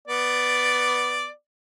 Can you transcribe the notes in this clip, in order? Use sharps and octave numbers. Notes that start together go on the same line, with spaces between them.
B3 D5